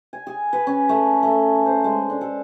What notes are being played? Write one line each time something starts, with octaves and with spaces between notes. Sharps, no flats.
G#5
G#4
B4
C#4
A3
A3
C5
G#3
D4
A4